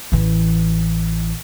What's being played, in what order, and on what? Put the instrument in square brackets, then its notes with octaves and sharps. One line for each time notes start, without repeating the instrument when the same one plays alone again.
[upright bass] A1 E3